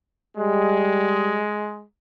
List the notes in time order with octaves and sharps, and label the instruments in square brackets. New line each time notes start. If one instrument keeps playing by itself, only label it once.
[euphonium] G3 [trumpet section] G#3